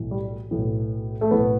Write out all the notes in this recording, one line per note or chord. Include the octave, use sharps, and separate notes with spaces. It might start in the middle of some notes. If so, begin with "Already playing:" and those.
Already playing: B1 A2 E3
G3
B1 A2 E3
A3
B1 A2 E3 B3